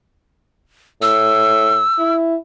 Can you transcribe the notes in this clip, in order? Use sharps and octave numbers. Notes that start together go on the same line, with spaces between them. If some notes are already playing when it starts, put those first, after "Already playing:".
A2 E6
E4